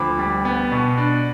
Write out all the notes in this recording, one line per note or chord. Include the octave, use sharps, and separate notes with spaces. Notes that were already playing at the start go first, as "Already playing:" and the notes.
Already playing: D2 F3 B5 D6
G3
B3
B2
D4